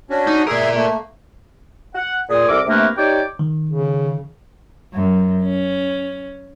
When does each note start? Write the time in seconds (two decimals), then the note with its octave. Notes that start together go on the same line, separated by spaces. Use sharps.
0.10 C#4 D4 F#4
0.27 D#4
0.47 G#4 A#4 D5 E5
0.74 A3 A#3
1.95 F#5
2.30 A#2 G#4
2.48 C2 A4 A#4 D6
2.67 C3 A3 A#3 D4 A#4 B4
2.97 D#4 G4 C#5 D5 G5 D6
3.39 D#3
3.70 C#3
4.93 F#2
5.44 C#4